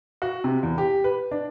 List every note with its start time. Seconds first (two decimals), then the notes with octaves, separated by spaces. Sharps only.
0.22 F#4
0.44 C3
0.63 E2
0.78 G4
1.04 B4
1.31 D4